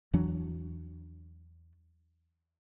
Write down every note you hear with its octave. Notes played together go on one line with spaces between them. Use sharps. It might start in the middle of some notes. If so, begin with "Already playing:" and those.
E2 E3 F#3 D4